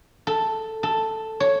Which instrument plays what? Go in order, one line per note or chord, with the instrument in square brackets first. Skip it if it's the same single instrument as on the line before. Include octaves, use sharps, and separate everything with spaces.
[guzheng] A4
A4
C#5